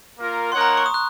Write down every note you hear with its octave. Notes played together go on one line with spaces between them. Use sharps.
A#3 F4 A#4
A#3 D#4 A#4 C#5 F#5 C6
A#5
C#6
D#6
F#6